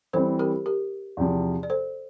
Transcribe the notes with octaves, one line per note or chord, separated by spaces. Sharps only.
E3 G3 C4 E4 A4 C5
G4 A#4
G4 A#4
E2 C3 F3
D5
A4 C5